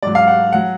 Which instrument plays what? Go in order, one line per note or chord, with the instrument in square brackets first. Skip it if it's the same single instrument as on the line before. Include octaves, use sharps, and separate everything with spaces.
[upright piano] G#2 F#3 D5
F5
F#5
F#3 F#5